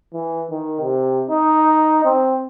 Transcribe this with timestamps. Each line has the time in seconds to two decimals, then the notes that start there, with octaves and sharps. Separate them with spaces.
0.14 E3
0.51 D#3
0.81 C3
1.31 D#4
2.05 C4